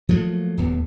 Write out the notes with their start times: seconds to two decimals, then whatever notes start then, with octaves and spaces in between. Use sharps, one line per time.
0.09 F3 F#3 A3 A#3
0.57 D1 D#2 B3